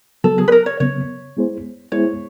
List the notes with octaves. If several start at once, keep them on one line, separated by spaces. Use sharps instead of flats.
C#3 F#3 B3 A4
G#4
B4
A#4
C#5
C#3 F#3 B3 C#5
G#3 B3 E4 G#4 C5
G#3 B3 E4 G#4 C5 C#5